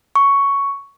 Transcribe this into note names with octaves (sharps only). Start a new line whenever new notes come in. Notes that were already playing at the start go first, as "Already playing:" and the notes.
C#6